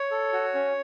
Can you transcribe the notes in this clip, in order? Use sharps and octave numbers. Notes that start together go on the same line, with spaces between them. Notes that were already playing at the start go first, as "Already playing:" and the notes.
Already playing: C#5
A4
F#4
C#4